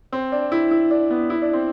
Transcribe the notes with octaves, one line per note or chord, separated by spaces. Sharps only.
C4
D4
E4
E4
D4
B3
E4
D4
C4